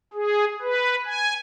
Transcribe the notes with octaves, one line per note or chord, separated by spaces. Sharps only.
G#4
B4
G#5